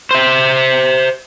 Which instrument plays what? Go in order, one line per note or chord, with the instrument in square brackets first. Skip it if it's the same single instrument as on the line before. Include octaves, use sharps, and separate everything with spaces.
[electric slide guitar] C5 E5